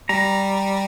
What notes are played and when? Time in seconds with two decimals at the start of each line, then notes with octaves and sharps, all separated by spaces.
0.09 G3 A#5